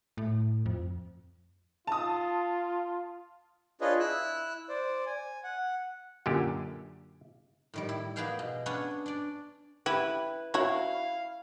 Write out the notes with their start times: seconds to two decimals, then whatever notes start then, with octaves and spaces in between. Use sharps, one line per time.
0.17 A2
0.66 F2
1.87 F4 A5 D#6
3.81 D4 F4 G#4 B4 C#5 D#5
4.00 E4 E6 F#6
4.69 C5 D5
5.06 G#5
5.44 F#5
6.26 F#2 A#2 D3 G4
7.74 A2 D#3 G3
7.89 E4
8.16 A#3 B3 D#4 G#4 F5 G5
8.39 B2
8.66 B3 C#4 D4 C#5 F#5 G#5
9.06 D4 D5
9.86 E4 G4 B4
10.54 E4 F#4 C#5 F5